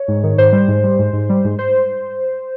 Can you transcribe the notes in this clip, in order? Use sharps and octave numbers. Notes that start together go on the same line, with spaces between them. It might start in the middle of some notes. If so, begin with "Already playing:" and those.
Already playing: C#5
G#2
D#3
G#2 C5
G3
G#2
G3
G#2
G#2
G3
G#2
C5